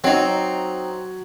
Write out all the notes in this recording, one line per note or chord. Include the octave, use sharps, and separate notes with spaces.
F#3 C4 D#4